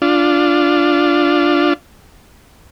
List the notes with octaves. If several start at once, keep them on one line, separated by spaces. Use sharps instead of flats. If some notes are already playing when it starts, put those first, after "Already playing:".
D4 F4